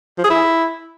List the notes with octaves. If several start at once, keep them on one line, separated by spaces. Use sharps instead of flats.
F3
G#4
E4